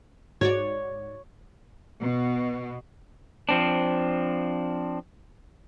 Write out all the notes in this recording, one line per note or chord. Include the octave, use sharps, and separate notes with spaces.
G#2 F#4 C#5 D5
B2
F3 C4 D4